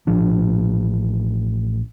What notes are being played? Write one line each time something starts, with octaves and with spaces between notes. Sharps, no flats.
A1 F3 D4